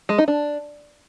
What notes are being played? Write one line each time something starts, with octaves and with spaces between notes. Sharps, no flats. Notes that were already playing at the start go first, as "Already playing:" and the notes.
G#3
D#4
D4